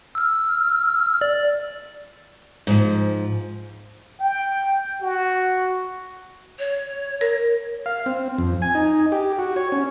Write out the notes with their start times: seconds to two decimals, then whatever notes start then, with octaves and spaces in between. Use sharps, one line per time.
0.15 E6 F6
1.21 D5
2.67 G#2 F3
4.21 G5
5.02 F#4
6.59 C#5
7.21 A#4
7.86 F5
8.06 C4
8.38 F2
8.62 G#5
8.75 D#4
9.12 G4
9.39 F#4
9.56 C#5
9.72 C#4